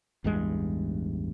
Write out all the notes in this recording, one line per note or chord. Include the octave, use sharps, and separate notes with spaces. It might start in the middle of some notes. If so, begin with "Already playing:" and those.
A1 E2 G2 G#3